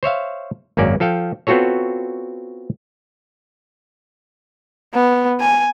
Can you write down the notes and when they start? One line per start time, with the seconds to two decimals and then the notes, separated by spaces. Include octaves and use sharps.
0.03 C5 C#5 E5 F5
0.77 G#1 F#2 A#3 C#4 D5
1.00 F3 A4 F5 G5
1.47 B3 C4 F4 F#4 A4 C#5
4.94 B3
5.40 G#5